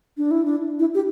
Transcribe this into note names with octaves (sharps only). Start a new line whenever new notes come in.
D4
E4
D4
E4
G4